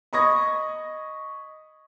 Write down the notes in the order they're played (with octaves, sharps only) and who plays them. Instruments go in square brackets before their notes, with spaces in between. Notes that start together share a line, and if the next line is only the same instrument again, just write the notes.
[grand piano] D#5 B5 C#6 D#6 G#6 A#6